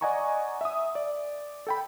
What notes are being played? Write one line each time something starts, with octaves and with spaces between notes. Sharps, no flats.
D5 D#5 F#5 G#5 A#5 C#6
E5 D#6
D5
A4 G5 B5